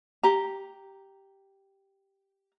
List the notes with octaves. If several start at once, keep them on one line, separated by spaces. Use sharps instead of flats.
G4 A#5